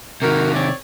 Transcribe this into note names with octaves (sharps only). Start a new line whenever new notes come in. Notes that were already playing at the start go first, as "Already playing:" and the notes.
C3 D#3 D#4 F#4 A#4
C4 C#5 D5